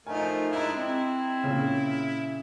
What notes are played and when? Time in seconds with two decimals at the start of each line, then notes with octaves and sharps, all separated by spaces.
0.07 F3 A3 D#4 A#4 G#5
0.52 G#3 D4 E4 D#5 A#5
0.77 C4 E4
1.44 A#2 C#3